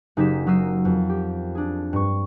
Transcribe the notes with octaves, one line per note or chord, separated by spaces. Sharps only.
F#1 D#4 G4 G#4 B6 E7
F#3 D#4 A#4 E6 C7 D#7
F2
G4
D4 G#4
G2 C#6